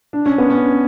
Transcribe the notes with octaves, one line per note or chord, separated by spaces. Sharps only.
D4
C#4
B3
C#4